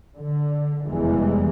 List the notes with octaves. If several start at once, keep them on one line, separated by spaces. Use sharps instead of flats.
D3
F1 E2 E3 G3 G#3